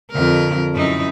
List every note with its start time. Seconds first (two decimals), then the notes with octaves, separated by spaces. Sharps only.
0.12 F2 D3 A#4
0.74 F#2 D#4 E4